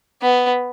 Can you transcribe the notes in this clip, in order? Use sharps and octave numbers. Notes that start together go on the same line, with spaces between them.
B3